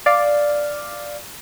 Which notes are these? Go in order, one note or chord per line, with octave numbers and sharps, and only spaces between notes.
D5 F5